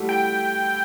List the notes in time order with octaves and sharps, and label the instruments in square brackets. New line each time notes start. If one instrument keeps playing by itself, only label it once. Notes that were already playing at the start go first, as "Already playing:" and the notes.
Already playing: [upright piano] G3 A3 E4 F#4
[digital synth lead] G5